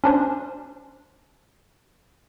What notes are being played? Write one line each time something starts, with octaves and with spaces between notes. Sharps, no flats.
C#4 D4 C5